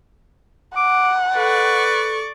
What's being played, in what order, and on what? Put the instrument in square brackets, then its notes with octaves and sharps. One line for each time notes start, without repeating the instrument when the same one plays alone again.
[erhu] F#5 [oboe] D6
[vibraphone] A4 [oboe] B4 [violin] D5 C#6